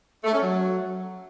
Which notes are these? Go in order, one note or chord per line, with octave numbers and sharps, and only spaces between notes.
A3
C#4
F#3